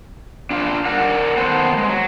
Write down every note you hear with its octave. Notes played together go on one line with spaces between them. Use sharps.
D4 F4 F5
A#4 D5 F#5
D#3 A#3 B3 A4 C5 F#5
G#3
F#3